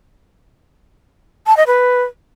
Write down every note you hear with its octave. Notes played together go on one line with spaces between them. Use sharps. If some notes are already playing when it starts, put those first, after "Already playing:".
A5
D#5
B4